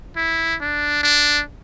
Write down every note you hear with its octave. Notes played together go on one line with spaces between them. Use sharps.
E4
D4
D4